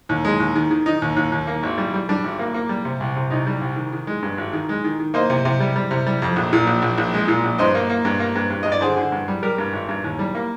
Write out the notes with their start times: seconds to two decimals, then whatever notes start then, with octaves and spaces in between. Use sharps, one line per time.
0.09 D#2
0.25 G#3
0.40 D#2
0.56 D#3
0.71 D#3
0.86 D#3 D#4
1.02 D#2
1.16 D#2
1.32 D#2
1.47 A#3
1.63 G#1
1.78 G3
1.94 G3
2.09 G3 D4
2.24 G#1
2.39 A#3
2.54 A#3
2.69 G3
2.85 C3
3.00 C2
3.16 C3
3.30 C2 D#4
3.47 G3
3.61 C2
3.76 D#3
3.92 D#3
4.07 G#3
4.23 G2
4.38 G#1
4.53 D#3
4.69 G#3
4.84 D#3
5.00 D#3
5.14 A#3 C5 D#5
5.30 C3
5.45 C3
5.60 G3
5.76 G3
5.91 C3
6.07 G3
6.22 F2
6.36 A#1
6.53 A#2
6.67 A#1
6.82 A#1
6.98 A#1
7.14 G#3
7.28 A#2
7.44 A#1
7.59 G2 C5 D#5
7.75 A#3
7.90 A#3
8.05 G2
8.20 A#3
8.35 G2
8.50 G2
8.63 G2 D#5
8.72 D5
8.81 D3 G#4 C5
8.97 D3
9.12 G2
9.28 G3
9.43 G3 G4 A#4
9.58 G2
9.73 G#1
9.89 G2
10.04 D#2
10.19 G3
10.35 A#3